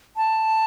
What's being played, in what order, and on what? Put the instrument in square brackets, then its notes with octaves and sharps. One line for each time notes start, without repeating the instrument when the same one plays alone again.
[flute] A5